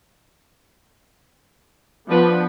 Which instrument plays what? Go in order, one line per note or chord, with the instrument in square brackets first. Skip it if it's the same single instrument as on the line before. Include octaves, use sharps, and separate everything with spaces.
[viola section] F3 B3 [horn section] D4 B4